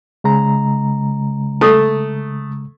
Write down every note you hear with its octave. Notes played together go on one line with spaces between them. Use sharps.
C#3 G#3 A#5
A3 D#6